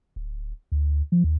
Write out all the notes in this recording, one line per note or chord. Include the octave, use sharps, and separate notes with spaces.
D1
D2
F3
D#2